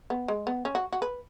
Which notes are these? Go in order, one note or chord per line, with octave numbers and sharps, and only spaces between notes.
B3
G#3
B3
C#4
F#4
F#4
B4